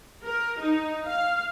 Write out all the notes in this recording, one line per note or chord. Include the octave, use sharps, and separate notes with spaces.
A#4
D#4
F5